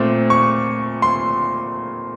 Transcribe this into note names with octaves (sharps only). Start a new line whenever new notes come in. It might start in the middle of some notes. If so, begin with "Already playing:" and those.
Already playing: A#2 A3 C4
C#6
C6